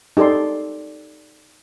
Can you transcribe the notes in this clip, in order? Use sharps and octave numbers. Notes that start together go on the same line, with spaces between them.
D#4 G4 A4 D5 C6